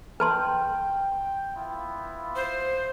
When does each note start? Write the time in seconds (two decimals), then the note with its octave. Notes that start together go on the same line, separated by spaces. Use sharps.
0.20 B4 G5 A5 C6
1.56 B3 E4 F4
2.36 C5